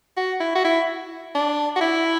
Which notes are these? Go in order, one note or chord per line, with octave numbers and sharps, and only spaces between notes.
F#4
E4
F#4
E4
D4
F#4
E4